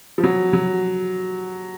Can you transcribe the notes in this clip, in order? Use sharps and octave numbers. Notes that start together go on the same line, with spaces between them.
F3
F#3
F#3